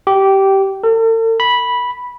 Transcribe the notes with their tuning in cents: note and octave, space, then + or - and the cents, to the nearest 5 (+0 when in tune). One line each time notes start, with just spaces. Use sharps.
G4 -15
A4 +45
B5 -10